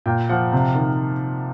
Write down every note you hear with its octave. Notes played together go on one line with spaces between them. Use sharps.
A#2 G5
F3 F#5
C3
D#3